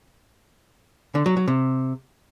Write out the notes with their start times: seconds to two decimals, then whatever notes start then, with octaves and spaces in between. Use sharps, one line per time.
1.15 D3
1.26 F#3
1.37 F#3
1.48 C3